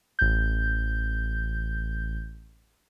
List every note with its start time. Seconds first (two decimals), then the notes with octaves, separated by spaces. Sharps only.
0.19 A1 G6